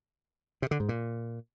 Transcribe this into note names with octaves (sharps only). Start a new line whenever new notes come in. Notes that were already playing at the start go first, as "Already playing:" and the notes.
C3
D3
G#2
A#2